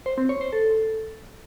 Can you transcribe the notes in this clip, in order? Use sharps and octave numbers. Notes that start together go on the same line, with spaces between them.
C5
C4
C#5
C5
A4